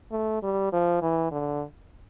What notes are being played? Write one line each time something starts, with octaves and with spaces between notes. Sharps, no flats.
A3
G3
F3
E3
D3